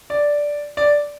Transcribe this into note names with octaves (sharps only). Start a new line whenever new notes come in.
D5
D5